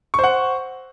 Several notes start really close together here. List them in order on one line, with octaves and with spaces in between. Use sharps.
C#6 C5 F#5